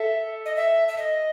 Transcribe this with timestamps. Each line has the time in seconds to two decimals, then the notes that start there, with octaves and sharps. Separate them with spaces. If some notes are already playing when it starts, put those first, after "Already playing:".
Already playing: A4 E5
0.45 D#5
0.56 E5
0.88 E5
0.98 D#5